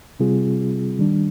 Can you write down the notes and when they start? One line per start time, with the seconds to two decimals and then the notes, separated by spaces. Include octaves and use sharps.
0.20 C3 G3 C4 F4 G#4
0.99 D#3 G3 D4